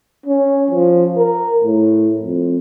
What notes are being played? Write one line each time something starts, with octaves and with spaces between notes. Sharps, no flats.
C#4
F3
A#4
A2
F2